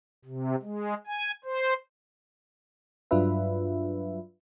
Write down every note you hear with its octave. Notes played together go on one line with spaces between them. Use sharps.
C3
G#3
G#5
C5
G2 F#3 D4 F4 B4 E5